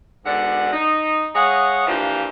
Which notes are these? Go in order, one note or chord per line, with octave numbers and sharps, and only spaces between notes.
G#2 B2 D3 D5 F#5
D#4
G#3 C#5 D#5 F5 F#5
E3 F3 A#3 D4 F4 G4